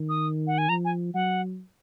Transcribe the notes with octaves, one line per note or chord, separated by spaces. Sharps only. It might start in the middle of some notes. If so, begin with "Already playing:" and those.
Already playing: D#3
D#6
F#5
G#5
F3 A#5
G#5
F#3 F#5